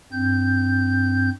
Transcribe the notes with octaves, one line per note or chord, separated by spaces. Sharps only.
G2 C4 G6